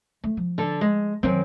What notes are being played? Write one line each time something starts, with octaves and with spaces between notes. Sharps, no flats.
A3
F3
D3 A4
G#3
F#2 D#3 F#3 C4